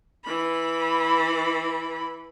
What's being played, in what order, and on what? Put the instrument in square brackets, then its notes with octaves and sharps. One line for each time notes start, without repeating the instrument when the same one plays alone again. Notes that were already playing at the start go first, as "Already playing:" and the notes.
[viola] E3 B5